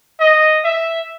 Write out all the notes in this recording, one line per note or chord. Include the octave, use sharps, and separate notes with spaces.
D#5
E5